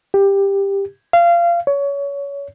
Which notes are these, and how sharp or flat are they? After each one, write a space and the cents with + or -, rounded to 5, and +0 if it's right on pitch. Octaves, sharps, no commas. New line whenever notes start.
G4 +15
F5 -25
C#5 +25